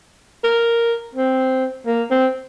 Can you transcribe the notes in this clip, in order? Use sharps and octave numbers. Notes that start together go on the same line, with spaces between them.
A#4
C4
A#3
C4